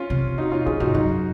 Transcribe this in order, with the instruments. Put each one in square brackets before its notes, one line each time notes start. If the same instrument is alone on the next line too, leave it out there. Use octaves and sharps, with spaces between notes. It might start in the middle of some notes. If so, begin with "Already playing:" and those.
Already playing: [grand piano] C#4 F4
[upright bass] C3
[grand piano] D#4 F#4
C#4 F4
[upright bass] C3 [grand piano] F4 G#4
[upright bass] G#2 [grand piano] D#4 F#4
[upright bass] F#2 [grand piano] D#4 F#4